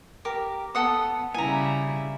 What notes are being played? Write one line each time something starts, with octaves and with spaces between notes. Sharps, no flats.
G4 A#4
B3 A4 F#5 D#6
C#3 G3 E4 G#5 A#5